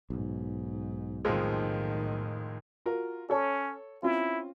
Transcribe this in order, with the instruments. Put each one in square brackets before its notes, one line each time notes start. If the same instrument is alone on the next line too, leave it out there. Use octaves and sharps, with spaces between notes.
[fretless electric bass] B1 [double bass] G#2
[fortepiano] F2 F3 G#3 [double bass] A2 D#3
[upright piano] F4 F#4 A#4
[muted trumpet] C#4 [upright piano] A4 C#5
[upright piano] C4 C#4 F4 [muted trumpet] E4